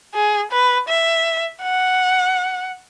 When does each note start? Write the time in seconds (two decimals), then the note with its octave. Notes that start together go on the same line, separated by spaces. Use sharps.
0.15 G#4
0.52 B4
0.88 E5
1.62 F#5